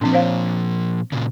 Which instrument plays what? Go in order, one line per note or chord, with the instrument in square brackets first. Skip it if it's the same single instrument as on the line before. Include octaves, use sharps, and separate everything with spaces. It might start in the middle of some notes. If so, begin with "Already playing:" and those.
[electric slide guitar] A#2 F3 [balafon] C4 D4
[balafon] C5 C#5 F5
[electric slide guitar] A#2 C#3